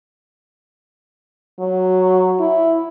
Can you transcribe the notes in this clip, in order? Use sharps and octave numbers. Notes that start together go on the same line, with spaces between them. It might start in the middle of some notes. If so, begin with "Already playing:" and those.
F#3
E4